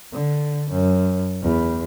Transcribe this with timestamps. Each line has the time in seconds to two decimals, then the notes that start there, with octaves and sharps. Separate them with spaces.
0.13 D3
0.71 F#2
1.42 E2